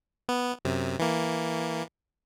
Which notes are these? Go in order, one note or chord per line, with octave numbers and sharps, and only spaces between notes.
B3
F#2 C3
E3 A#3